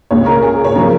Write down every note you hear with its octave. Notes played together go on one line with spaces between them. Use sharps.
C#2 C#3 G#3 C#5
A#4
G#4
C#5
C#3 F3 A#4